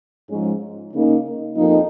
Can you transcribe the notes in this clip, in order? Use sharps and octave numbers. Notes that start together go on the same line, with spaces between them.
G#2 F3 G#3 C#4
C#3 A#3 D#4
F2 F3 A#3 D#4